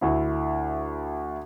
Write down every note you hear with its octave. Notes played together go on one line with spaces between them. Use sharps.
D2 E4